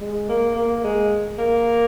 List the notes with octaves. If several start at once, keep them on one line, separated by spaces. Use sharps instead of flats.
G#3
A#3
A#3
G#3
A#3